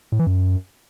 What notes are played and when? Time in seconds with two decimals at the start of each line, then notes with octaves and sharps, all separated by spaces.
0.12 A2
0.19 E3
0.27 F#2